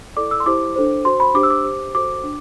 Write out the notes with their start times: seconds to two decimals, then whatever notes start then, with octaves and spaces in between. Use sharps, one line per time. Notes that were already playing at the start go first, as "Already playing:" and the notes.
0.16 E4 A4 D5 D6
0.31 E6
0.40 C6
0.46 E4 G4 C5 D6
0.76 D4 A4 C5
1.05 F#4 C5 C6
1.20 B5
1.35 D4 G4 C5 D6
1.43 E6
1.50 D6
1.64 G4 C5
1.95 F#4 A4 C5 D6
2.24 D4